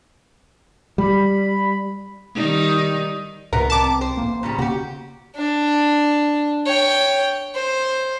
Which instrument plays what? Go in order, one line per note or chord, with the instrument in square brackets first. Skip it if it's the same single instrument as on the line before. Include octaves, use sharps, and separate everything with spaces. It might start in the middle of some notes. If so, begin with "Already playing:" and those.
[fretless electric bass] G3 [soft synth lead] B5
[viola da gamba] D#3 G3 D#4
[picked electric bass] C#2 A2 C#3 [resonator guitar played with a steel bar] B3 B4 A#5 [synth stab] A#4
[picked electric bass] C2 C4 [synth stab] A5 D6
[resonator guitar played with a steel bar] C5
[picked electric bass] A1 A#3
[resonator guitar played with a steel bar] A#2 C#3 G3
[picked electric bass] C#3 A#3 [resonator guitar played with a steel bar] F#4 G4
[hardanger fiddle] D4
C#5 G5
C5